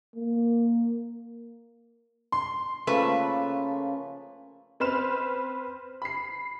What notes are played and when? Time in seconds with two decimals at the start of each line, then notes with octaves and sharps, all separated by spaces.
0.15 A#3
2.32 C6
2.87 C#3 F3 A3 A#3 B4
4.80 C4 B4 C5 F6 E7
6.02 B5 C7